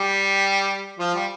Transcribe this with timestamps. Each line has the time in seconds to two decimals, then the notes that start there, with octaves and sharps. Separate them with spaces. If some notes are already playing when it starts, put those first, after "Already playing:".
Already playing: G3 G4
0.99 F3 F4
1.15 G3